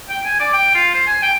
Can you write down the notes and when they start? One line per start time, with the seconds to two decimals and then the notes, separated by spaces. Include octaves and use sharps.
0.09 G5
0.25 G#5
0.40 D5
0.54 G5
0.74 F4
0.94 C5
1.07 G#5
1.23 G5